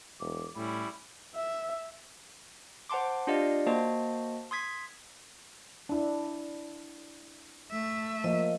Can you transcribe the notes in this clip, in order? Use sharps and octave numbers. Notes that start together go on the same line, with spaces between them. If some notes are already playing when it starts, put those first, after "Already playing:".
E1 D6
A2 G3 C#4 E4 B5
E5
C5 F#5 A5 C6 D6
D4 F4 G4 D5 D#5 F5
A#3 F#4 C5 D#5 A5
C6 D#6 G#6 B6
D4 E4
A3 E5
F3 A#3 D#5